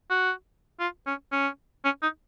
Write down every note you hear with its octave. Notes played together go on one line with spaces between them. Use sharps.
F#4
F4
C#4
C#4
C#4
D#4